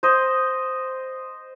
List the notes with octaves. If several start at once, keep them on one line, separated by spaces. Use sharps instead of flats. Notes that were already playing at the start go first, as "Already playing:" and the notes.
C5 D#5